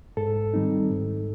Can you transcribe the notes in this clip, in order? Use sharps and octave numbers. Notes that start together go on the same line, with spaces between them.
G#2 A4
D#3 G3 C4 D#4
G#2